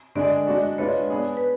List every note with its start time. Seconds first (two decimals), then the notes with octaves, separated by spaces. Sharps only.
0.15 D3 G#3 D4 G#4 D5
0.47 G#3 D4 F#4
0.78 G#3 D4 F4 B4 C#5
1.10 B3 D4 G#4
1.37 B4